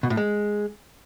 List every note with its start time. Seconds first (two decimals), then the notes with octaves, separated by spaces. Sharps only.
0.03 B2
0.10 A2
0.17 G#3